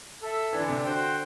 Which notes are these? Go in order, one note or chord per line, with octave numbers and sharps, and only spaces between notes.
A4 E5
E3 D4
D3
C3
D3
F#4 C5 G5